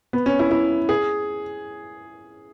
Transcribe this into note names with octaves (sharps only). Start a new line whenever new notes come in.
B3
C#4
E4
E4
G#4